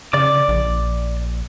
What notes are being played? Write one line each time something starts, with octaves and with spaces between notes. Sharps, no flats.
C#3 D5 D6
A#1